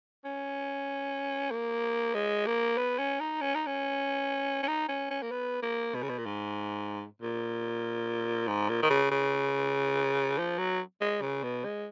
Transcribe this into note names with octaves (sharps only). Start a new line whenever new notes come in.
C#4
A#3
G#3
A#3
B3
C#4
D#4
C#4
D#4
C#4
C#4
D#4
C#4
C#4
A#3
B3
A#3
B2
C#3
B2
A#2
G#2
A#2
G#2
A#2
D#3
C#3
C#3
F3
F#3
G#3
C#3
B2
G#3